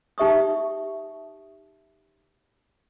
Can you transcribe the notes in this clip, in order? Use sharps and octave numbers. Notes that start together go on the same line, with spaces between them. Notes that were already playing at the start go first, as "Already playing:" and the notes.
D#4 G4 E5 C#6 D#6